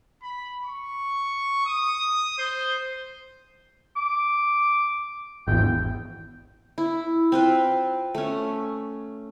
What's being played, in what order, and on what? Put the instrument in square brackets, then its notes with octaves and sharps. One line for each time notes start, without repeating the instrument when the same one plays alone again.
[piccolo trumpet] B5
C#6
D#6
C5
[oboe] D6
[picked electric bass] G#1 E2 [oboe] G5
[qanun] E4
C4 F4 B4
A3 C#4